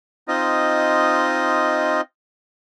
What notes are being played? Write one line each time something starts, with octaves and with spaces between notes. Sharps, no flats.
C4 D#4 F4 D#5